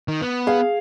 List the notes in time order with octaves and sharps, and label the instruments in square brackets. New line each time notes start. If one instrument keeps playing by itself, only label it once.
[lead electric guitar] D#3
B3
[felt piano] G#4 [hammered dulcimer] F5